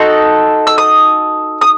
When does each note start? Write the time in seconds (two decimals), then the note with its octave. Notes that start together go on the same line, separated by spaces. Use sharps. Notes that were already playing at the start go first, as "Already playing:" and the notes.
Already playing: D#4 F#4 A4 C6
0.67 E6
0.78 D#6
1.61 D#6